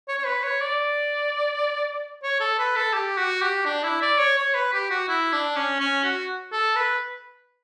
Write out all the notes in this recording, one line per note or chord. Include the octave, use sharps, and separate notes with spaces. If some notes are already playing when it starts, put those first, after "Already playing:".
C#5
C#5
B4
C#5
D5
C#5
A4
B4
A4
G4
F#4
G4
D4
E4
D5
C#5
C#5
B4
G4
F#4
E4
D4
C#4
C#4
F#4
A4
B4